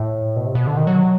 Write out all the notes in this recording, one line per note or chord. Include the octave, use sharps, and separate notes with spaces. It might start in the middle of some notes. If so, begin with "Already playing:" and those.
Already playing: A2
B2
C3
B2
D3
D#3
F#3